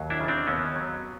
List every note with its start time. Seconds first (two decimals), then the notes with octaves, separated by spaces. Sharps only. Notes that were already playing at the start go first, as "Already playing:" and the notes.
Already playing: D#2 F#3
0.10 D4 E4
0.20 C#3
0.28 C4 D4
0.47 D#2 B3 C#4
0.76 F#3